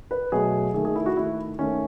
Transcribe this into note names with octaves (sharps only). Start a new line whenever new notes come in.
B4
B2 F#3 A3 G#4
D#3 A3 G#4
G#4
E4
F#4
D#3 A3 E4
D#3 A3 C#4